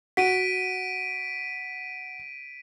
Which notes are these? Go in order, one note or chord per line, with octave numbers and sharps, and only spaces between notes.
F#4 B6 D7 D#7